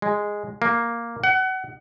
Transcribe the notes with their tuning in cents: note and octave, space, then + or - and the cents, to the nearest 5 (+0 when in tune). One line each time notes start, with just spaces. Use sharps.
G#3 -5
A#3 +0
F#5 +30